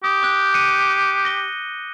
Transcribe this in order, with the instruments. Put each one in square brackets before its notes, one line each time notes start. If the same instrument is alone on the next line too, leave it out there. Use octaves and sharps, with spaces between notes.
[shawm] G4 [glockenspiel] D#6
[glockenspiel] D6 F#6 G6
F#6 C#7 D#7
A#6 G7